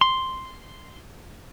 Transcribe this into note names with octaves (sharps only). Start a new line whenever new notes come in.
C6